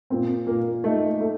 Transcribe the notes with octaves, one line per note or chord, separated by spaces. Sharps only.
A#2 C4
A#2 A#3
A3 D#4
A3